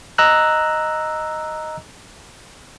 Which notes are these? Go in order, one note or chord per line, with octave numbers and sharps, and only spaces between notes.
D#5 A#5 E6 F#6